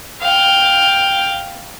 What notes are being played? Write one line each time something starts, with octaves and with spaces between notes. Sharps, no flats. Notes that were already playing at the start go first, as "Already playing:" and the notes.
F5 G5